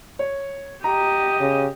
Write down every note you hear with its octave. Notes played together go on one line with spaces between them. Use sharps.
C#5
G4 D#5 A#5
C#3